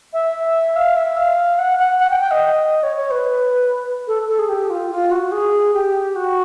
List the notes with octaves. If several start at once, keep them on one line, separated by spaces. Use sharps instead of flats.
E5
F5
E5
F5
F#5
F#5
F#5
G5
G5
D#5
C#5
C#5
B4
A4
A4
G#4
G4
F4
F4
F#4
G#4
G4
F#4